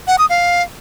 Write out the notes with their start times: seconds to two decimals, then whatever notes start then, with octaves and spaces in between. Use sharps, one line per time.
0.07 F#5
0.18 D#6
0.29 F5